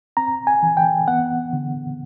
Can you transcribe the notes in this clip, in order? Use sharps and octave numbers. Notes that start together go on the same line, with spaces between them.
C4 A#5
G#5
E3
G5
B3 F#5
D3